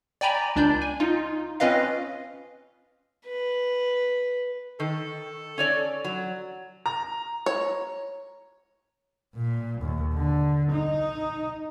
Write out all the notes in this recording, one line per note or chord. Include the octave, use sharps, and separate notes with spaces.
D5 G5 G#5 A#5 B5
C#2 D4 D5 G6
G#5
D#4 F4
C4 C#4 F4 B4 D#5 F5
B4
D#3 A4
C#4 C#5 D5
F#3
A#5
C#5
A#2
D#2
D3
D#4